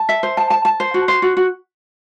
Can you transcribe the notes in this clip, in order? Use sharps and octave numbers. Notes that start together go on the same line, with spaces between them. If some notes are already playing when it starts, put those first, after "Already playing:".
Already playing: A5
E5
C5
A5
A5
A5
C5
F#4
C5
F#4
F#4